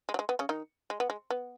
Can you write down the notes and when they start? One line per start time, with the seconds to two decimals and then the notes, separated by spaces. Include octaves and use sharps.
0.09 G#3
0.14 F#3
0.19 G#3
0.29 B3
0.39 C#3 C#4
0.49 D#3 D#4
0.90 G#3
1.00 B3
1.10 G#3
1.30 B3